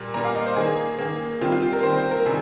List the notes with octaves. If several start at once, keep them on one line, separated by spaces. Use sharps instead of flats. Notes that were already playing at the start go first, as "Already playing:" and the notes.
Already playing: A#2 G3 A#3
A#2 G3 A#3 A#5
F5
D#5
C5
D#3 A#3 G#4
D#3 A#3
D#3 G3 C4 F4
F4
G4
A#4
D#3 G3 C4 C5
C5
A#4
C3 D#3 G3 G#4